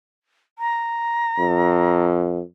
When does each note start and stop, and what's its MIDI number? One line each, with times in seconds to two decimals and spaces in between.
0.59 2.04 82
1.38 2.40 41